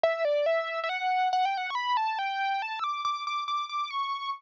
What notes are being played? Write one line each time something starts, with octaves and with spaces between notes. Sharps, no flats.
E5
D5
E5
E5
F#5
F#5
G5
F#5
C#6
B5
A5
G5
A5
E6
D6
D6
D6
D6
D6
C#6